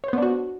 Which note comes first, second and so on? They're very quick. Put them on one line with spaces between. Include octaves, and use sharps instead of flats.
C#5 C5 B3 D4 F#4